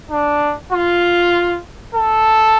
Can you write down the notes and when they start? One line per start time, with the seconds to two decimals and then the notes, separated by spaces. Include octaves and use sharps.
0.11 D4
0.72 F4
1.95 A4